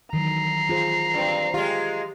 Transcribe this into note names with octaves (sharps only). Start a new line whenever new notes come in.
D#3 E3 F#3 A#5 C7
F4 G#4 C5
G2 C4
G#3 F4 G4